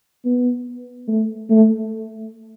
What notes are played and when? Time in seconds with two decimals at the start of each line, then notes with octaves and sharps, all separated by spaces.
0.25 B3
1.08 A3
1.50 A3